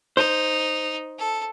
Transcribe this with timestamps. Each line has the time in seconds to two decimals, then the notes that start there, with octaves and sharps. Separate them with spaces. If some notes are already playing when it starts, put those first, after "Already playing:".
0.17 D#4 C5
1.19 A4